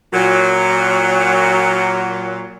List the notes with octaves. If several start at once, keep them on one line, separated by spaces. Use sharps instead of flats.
A#2 F#3